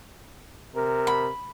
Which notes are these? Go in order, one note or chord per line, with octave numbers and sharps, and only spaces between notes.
C3 A#4
B5